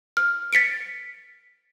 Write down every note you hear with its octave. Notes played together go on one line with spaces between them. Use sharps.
F6
A6 B6 C#7 D7